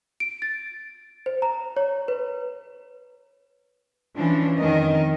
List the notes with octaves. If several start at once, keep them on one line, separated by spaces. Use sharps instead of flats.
D7
A6
C5
A#5
C#5
B4
E3 F3 C#4 D4
F2 D#3 A#4 D#5